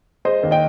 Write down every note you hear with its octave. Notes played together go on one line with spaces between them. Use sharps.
G#3 C5 D#5
D#2
D#5 G5